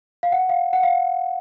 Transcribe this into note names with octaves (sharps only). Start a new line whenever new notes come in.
F5
F#5
F5
F#5
F5